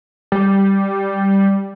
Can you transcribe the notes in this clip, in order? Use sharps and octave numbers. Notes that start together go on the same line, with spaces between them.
G3